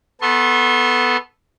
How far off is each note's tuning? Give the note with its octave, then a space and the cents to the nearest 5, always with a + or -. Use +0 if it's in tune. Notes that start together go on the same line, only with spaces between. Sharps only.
B3 +0 A4 -5 C6 +45